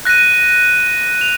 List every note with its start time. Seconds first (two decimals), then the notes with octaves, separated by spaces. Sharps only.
0.05 F#6 A#6 D#7
1.21 F7